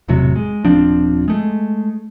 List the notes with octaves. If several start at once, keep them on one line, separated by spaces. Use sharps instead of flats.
E1 A2 C3 F#3
G#3
D#1 F3 C4 D4
G#3 A3